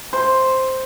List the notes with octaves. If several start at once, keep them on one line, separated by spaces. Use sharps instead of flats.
C5